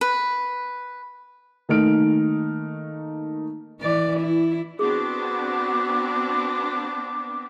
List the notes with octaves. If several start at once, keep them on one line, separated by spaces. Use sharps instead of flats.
B4
D#3 A3 A#3 D#4 F6 D7
E3 D5
E4
B3 C4 D4 F#4 G#4 D6